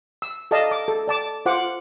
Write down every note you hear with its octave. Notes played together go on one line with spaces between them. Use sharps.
E6
A4 D5 D#5 F5 A5
D6
A4
D5 A5 D6
F4 C5 F#5 D6